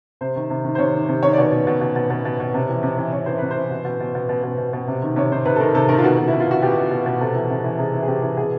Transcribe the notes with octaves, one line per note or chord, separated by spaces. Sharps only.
C3 C5
D#3
C3
D#3
C5
C3 C#5
D#3
C3
D#3 C#5
D5
B2 C#5
B2
B2
B2
B2
B2
B2
B2
C3
E3
C3
E3
C3 C#5
E3 C5
C3 B4
C5
E3
B2
B2
B2
B2
B2
B2
B2
B2
C3
D#3
C3 C#5
D#3 C5
C3 B4
A4
D#3 A#4
C3 A4
D#3 A#4
F4
B2 F#4
B2
E4
B2
F4
B2 F#4
B2 G4
B2
B2
B2
C3 A4
E3
C3
E3
C3 G#4
E3
G#4
C3 G4
E3
B2 G#4